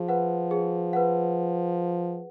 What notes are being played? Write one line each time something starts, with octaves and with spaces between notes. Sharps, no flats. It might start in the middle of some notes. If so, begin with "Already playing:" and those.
Already playing: F3 G#4
B4 F#5
G#4
B4 F#5